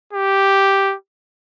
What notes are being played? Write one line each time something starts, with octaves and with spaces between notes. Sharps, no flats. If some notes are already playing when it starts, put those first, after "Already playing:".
G4